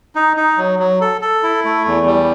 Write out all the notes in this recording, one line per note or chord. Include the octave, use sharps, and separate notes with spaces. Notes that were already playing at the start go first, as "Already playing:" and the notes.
D#4
D#4
F#3
F#3
A4
A4
E4
A3
E2
G3